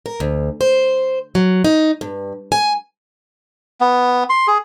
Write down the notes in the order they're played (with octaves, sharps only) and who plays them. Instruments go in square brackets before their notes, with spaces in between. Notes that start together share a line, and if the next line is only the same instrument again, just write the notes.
[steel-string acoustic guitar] A#4
D2
C5
F#3
D#4
G2
G#5
[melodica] B3
C6
G#4